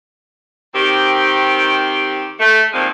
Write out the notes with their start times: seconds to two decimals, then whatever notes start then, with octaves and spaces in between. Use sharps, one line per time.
0.74 D#3 C4 G4
2.39 A3
2.73 D#3 F3 G3 G#3 A#3 C4